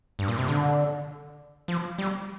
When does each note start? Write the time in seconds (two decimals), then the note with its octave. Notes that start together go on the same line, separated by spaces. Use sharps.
0.19 G2
0.28 A#2
0.38 C3
0.48 D3
1.68 F3
1.98 G3